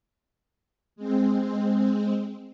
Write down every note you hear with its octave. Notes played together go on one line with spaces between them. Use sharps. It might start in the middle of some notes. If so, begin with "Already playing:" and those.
G#3 C4